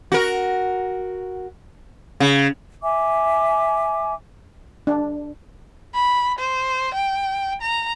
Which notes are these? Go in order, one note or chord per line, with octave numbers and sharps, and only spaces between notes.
F#4 A#4
C#3
E5 G#5 D6
D4
B5
C5
G5
A#5